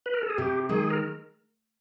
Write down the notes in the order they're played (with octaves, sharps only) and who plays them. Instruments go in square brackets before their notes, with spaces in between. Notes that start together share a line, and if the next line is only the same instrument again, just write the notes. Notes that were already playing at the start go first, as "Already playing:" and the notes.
[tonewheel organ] B4
A#4
A4
G#4
[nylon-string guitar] C3 [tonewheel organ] G4
[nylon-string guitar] D#3 G#3 [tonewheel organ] G#4
[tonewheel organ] A#4